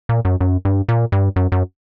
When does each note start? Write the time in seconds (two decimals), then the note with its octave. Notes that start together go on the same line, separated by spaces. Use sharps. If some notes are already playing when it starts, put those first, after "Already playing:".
0.09 A#2
0.25 F#2
0.41 F#2
0.65 G2
0.89 A#2
1.12 G2
1.36 F#2
1.52 F#2